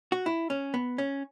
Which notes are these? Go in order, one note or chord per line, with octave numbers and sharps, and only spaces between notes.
F#4
E4
C#4
B3
C#4